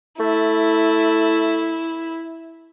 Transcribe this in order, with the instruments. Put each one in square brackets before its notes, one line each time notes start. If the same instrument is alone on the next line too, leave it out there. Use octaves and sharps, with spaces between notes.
[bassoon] A3 [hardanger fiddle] E4